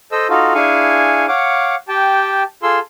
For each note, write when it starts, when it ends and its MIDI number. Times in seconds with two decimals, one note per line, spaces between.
0.12 0.27 69
0.12 0.27 72
0.12 0.27 75
0.12 0.27 88
0.30 0.53 63
0.30 0.53 65
0.30 0.53 66
0.30 0.53 69
0.55 1.26 62
0.55 1.26 64
0.55 1.26 68
0.55 1.26 77
0.55 1.26 80
0.55 1.26 85
1.28 1.75 73
1.28 1.75 77
1.28 1.75 78
1.28 1.75 86
1.88 2.43 67
1.88 2.43 79
1.88 2.43 81
2.63 2.79 65
2.63 2.79 68
2.63 2.79 69
2.63 2.79 84
2.63 2.79 88